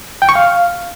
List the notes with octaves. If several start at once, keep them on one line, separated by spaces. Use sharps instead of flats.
G5
C#6
F5